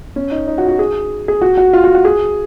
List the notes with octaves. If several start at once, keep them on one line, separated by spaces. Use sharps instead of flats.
C#4
D#4
D#4
F#4
F#4
G#4
G#4
F#4
F#4
F4
F#4
F#4
G#4